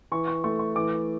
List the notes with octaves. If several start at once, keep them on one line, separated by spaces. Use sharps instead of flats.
E3 C#6
C#6
A3 C#6
C#6
E3 D6